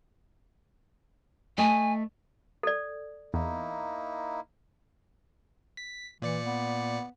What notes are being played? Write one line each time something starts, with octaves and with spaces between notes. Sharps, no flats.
A3 D#5 G#5
A4 D5
E2 A#3 D#4 E4
B6
A#2 E3 D5 C#7
B3